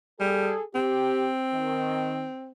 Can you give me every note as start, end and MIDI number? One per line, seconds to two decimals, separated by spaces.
0.20 0.53 55
0.20 0.63 68
0.20 0.63 69
0.75 2.51 60
0.75 1.29 67
1.54 2.26 51